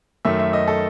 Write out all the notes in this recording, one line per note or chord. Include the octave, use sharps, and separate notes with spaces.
F#2 D#3 A3 E5
E5
D#5
A4